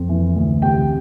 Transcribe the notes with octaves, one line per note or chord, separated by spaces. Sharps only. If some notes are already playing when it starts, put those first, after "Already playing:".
Already playing: F2
E3
D2
C3 G5